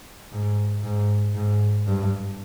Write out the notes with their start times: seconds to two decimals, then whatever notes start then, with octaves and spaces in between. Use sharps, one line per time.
0.32 G#2
0.84 G#2
1.35 G#2
1.87 G2